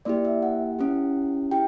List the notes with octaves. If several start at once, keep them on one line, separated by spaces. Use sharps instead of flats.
A#3 E4 G4 D5
E5
F#5
C#4 E4 G4
E4 G4 G5